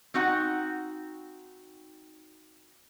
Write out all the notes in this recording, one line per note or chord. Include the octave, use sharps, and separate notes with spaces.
C4 D#4 F#4 F#5